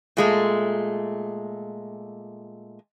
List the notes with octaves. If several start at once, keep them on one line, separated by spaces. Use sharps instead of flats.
A#2 G#3 A3